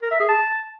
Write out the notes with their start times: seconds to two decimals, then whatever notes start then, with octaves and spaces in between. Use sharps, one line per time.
0.02 A#4
0.11 E5
0.20 G#4
0.29 A5